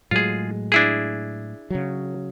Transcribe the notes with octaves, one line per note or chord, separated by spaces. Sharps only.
A2 F#3 G#3 F4 G#4
D4 E4 G#4
C#3 F#3